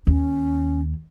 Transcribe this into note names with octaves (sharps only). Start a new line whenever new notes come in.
D#2 C#4